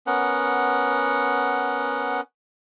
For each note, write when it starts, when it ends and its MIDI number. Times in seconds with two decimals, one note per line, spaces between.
0.07 2.21 59
0.07 2.21 61
0.07 2.21 70
0.07 2.21 78